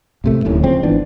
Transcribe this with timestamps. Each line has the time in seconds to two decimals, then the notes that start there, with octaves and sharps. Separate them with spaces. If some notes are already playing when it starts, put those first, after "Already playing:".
0.24 A2 C3 A3
0.45 D1 D#2 A2 C#4
0.63 C#3 F3 G#3 C4
0.83 G#1 E3 B3 D4